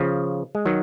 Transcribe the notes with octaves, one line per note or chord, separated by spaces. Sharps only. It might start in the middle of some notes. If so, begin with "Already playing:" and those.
Already playing: C#3 F3
G#3
D#3 F#3